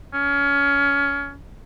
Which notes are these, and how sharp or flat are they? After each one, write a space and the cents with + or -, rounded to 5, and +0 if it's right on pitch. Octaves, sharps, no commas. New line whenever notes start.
C#4 +25